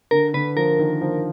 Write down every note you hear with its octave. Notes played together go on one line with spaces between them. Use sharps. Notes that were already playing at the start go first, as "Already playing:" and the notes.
D3 A#4
D3 B4
F3 A#4
D#3
F3